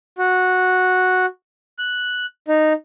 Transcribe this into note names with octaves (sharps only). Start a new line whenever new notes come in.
F#4
F#6
D#4